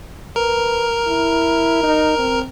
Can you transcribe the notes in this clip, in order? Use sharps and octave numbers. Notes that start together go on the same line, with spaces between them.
A#4 B4
E4
D#4
C4